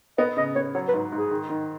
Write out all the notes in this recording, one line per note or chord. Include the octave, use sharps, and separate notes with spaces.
B3 D#5
C#3 D#5
B3 C#5
F#3 C#5
B4
G#2
G#2 G#4
D#3
D#3